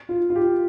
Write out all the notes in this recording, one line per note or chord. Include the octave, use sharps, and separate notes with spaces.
F4
F4
G4